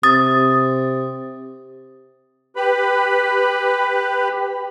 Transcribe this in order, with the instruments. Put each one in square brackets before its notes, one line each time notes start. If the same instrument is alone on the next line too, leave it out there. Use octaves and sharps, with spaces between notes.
[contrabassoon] C3 [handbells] D#6 A6
[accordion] G4 B4 B5